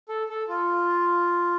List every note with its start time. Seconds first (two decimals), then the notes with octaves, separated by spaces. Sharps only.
0.09 A4
0.29 A4
0.49 F4